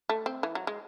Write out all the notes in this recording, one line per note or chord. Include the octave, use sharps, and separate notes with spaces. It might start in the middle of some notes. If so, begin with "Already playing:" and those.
A3
C4
E3
F#3
G#3